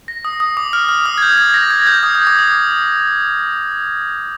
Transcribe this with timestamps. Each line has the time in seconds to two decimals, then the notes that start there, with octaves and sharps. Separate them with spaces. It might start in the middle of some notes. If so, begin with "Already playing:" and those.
0.08 A#6
0.25 D#6
0.40 D#6
0.57 D6
0.73 F6
0.89 D6
1.06 D#6
1.18 G#6
1.22 G6
1.38 G#6
1.54 A#6
1.70 G#6
1.87 G6
2.03 D#6
2.15 D#6
2.27 D6
2.39 D#6